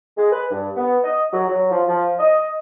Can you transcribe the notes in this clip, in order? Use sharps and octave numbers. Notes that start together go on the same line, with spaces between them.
G#3
B4
G2
B3
D#5
F#3
F#3
F3
F3
D#5